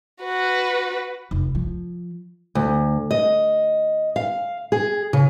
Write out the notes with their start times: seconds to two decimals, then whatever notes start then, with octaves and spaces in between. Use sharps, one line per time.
0.22 F#4 B4
1.31 F1
1.55 F3
2.55 D2
3.11 D#5
4.16 F5
4.72 G#4
5.13 C#3